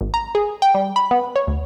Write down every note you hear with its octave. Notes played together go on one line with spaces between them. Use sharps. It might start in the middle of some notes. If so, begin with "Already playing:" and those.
G#1
A#5
G#4
G5
G3
B5
B3
C#5
D2